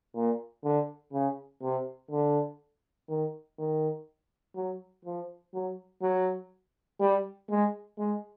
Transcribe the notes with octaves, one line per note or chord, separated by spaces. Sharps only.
A#2
D3
C#3
C3
D3
D#3
D#3
F#3
F3
F#3
F#3
G3
G#3
G#3